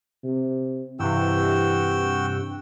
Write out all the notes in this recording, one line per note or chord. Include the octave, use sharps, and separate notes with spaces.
C3
G2 C3 E3 F#4 G5 E6